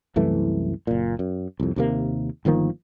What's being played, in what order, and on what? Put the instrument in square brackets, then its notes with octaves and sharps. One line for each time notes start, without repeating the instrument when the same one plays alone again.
[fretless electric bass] C2 F#2 E3 A3
F#1 A#2
F#2
C2 F2
D#2 C3 A#3
G1 D#3 F3 A#3